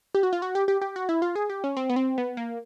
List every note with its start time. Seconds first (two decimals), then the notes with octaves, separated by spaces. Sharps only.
0.14 G4
0.23 F#4
0.33 F4
0.42 F#4
0.55 G4
0.68 G4
0.81 G4
0.96 F#4
1.09 E4
1.22 F4
1.36 G#4
1.50 G4
1.64 C#4
1.77 C4
1.90 B3
1.96 C4
2.18 B3
2.37 A#3